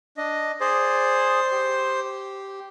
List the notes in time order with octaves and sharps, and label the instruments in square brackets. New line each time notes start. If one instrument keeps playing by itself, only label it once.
[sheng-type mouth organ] D4 D#5
[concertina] G#4 D5 [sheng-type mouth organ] C5
[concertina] G4